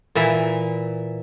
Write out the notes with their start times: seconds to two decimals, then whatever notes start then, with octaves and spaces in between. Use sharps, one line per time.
0.15 A#2 E3 E5